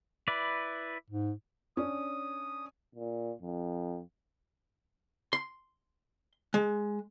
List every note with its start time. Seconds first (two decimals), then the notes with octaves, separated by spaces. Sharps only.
0.28 E4 B4 D5
1.10 G#2
1.77 C#4 D4 D#6
2.95 A#2
3.42 F2
5.33 C6
6.54 G#3